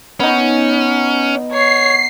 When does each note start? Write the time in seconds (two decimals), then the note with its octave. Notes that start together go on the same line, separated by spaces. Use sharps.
0.20 B3 C#4 D#4
1.51 C#5 C7